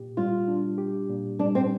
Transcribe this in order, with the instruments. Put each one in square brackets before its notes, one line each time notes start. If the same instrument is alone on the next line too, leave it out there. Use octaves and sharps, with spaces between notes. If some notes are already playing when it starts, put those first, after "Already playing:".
Already playing: [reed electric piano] A#2 G4
[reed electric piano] G3 [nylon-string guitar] F4
[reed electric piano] D4
G4
A#2
[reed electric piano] G3 [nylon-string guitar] D4
[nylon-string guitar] C4